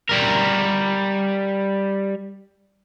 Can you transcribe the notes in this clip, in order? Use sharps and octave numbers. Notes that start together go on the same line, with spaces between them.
G3 A#4